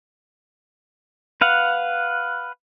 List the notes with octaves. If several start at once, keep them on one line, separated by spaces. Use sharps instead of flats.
B4 F5 F#5